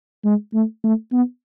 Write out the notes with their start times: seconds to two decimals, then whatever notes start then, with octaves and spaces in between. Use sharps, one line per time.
0.25 G#3
0.54 A3
0.84 A3
1.13 B3